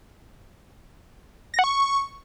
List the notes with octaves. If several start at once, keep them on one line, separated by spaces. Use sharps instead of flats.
A#6
F#5
C#6